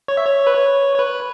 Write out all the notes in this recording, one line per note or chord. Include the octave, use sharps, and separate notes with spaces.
C#5
E5
C#5
B4
C#5
C#5
B4